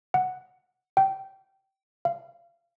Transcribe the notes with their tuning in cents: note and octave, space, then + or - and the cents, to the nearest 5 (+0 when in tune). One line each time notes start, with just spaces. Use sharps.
F#5 +0
G5 -20
F5 -30